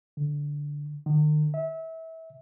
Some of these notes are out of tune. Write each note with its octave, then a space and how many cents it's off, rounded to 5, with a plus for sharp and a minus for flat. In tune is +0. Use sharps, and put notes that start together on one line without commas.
D3 -10
D#3 -45
E5 -25